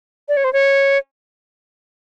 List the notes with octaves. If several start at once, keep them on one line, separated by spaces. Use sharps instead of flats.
D5
C#5
C5
C#5